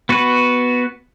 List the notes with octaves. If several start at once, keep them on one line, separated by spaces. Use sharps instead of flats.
B3 F#4 B4